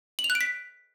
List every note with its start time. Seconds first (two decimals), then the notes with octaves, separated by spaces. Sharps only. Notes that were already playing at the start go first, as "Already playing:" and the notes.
0.19 F#7
0.24 F7
0.30 F#6
0.35 D7
0.41 B6